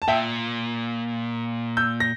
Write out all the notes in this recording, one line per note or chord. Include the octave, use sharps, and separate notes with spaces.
A5
A#2 E5 G5
E6 G6
A#6